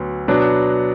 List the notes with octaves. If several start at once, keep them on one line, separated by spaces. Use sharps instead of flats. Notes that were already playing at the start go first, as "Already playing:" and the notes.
Already playing: D2 F#3 B3
B2 F#3 B3 D4